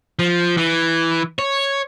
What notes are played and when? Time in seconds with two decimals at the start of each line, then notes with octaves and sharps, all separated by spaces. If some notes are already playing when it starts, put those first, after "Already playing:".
0.19 F3
0.57 E3
1.39 C#5